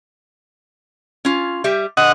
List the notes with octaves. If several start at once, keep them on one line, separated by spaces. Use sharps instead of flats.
C#4 F4
G3 G4 E5
D3 D#5 F#5